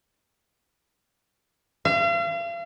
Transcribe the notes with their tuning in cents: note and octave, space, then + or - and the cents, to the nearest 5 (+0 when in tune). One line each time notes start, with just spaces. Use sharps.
F5 -40